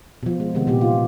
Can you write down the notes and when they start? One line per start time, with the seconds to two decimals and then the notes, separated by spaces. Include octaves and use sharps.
0.23 B2 F3
0.40 G#3
0.55 C3 D#3 G#3 B3
0.67 A#2 E3 B3 G4
0.81 F4